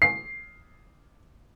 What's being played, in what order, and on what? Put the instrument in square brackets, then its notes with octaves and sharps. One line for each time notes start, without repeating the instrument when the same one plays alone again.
[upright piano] C7